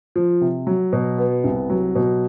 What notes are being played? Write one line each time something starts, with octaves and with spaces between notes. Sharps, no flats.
F3
C3
F#3
B2
B3
C2
F#3
B2